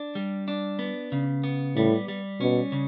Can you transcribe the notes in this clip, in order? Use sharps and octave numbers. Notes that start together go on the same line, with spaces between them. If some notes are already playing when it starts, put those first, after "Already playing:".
Already playing: D4
G3
D4
B3
C#3
B3
A2 G3
G3
B2 C#4
C#3